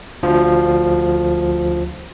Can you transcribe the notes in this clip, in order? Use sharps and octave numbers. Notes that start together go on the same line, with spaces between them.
D2 F3